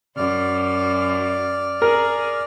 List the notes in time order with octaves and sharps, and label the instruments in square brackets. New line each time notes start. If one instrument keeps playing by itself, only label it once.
[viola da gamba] F#2 [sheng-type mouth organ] D5 F6
[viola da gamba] G#4 [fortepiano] A#4